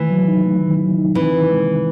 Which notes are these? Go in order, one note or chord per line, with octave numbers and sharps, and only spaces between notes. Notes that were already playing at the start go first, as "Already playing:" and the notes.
Already playing: D#3 E3 A3
F#3
D#4
A3
D#3
F#3
D#4
E3 C4
D#3
G#3
D#3